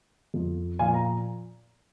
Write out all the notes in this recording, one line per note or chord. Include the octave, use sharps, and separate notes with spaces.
F2 F3
A#2 F3 F5 G#5
A#5